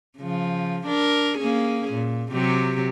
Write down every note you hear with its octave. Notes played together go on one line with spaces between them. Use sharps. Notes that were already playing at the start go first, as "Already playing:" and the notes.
C#3 F3
D4 A#4
A#3 C#4 G#4
A#2
C3 F#3 G4